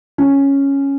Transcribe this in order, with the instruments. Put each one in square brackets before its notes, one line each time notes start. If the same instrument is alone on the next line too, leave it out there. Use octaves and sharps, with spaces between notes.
[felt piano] C#4